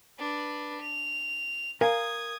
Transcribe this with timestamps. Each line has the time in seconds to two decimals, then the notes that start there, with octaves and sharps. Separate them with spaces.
0.19 D4 B4
0.81 F7
1.81 A#4 F5 G#5 D#6 G#6